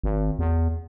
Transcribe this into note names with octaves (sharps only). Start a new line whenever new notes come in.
G#1
E2